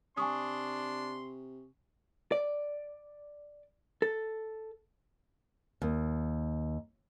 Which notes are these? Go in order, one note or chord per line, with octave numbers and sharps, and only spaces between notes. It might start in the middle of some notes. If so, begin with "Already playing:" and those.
C3 D4 G#5 C6 C#6 D#6
D5
A4
D#2